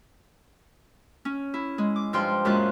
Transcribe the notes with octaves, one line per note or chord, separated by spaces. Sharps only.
C#4
E4
G#3
D6
G2 F3 G5 C6 F6
F#2 A#2 G#3 F4 F#6